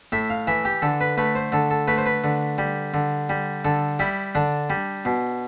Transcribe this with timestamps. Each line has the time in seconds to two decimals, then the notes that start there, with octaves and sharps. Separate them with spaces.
0.12 A2 E5
0.30 F5
0.47 E3 E5
0.65 G4
0.82 D3 A4
1.01 B4
1.17 A3 B4
1.35 C5
1.52 D3 A4
1.71 A4
1.87 A3 B4
1.98 C5
2.06 B4
2.24 D3
2.58 G3
2.94 D3
3.29 G3
3.65 D3 A4
3.99 G3 E4
4.35 D3 D4
4.70 G3
5.05 B2